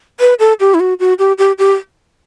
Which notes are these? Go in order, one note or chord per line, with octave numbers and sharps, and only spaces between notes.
B4
A4
G4
E4
F#4
F#4
G4
G4
G4